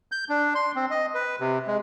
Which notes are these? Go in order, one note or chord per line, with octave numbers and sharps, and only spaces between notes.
G6
D4
C6
C4
D#5
B4
C3
G#3